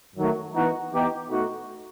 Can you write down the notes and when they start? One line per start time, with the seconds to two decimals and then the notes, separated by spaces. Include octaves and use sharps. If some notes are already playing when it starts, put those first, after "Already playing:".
0.16 F#2 D#3 F#3 A3
0.54 E3 B3 D#4 F#4
0.92 E3 B3 D#4 G4
1.30 B2 A3 D#4 F#4